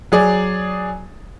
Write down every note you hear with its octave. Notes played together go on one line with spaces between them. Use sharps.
F#3 G#4 D5